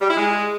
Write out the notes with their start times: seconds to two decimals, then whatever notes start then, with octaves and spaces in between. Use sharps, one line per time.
0.01 G3
0.09 E4
0.17 G#3